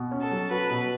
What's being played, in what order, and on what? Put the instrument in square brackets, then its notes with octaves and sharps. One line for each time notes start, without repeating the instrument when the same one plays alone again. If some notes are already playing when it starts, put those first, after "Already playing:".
Already playing: [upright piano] B2
C#4
[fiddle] A4
[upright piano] F#3
[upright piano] F#4 [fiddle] B4
[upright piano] B2